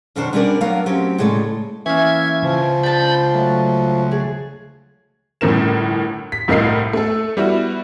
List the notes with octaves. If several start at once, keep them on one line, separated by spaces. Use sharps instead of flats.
F#2 B2 D#3 D4 C5 C#5
G3 B3 C#4 D4 A#4 D5
F#3 A3 B3 D4 A#4 F5
F#3 C4 C#4 G4
A2 C#3 G#3 A3 D5
E3 A#3 C#4 E4 E5 G#6
C#2 F3
D4 A5 B5 G6
F#3 A3
G#4
G1 A2 C#4 A#4 E7
B6
C2 A2 A#4 D#5 F5 C7
A3 A4
G3 B3 E4 F#4